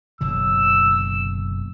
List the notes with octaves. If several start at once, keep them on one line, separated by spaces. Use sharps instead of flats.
F#1 B2 D3 E6